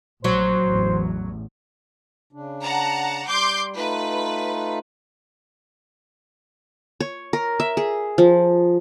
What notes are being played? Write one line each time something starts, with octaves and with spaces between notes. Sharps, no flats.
A#1 F#3 C5
A1 E2
C#3 D4
F#5 A5 A#5
G3 C6 D6 G6
A3 D#4 F4 B4
C#5
A#4
E5
G#4
F3